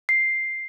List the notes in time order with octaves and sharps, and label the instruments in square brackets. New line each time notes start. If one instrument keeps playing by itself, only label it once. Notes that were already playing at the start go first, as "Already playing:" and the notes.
[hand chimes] C7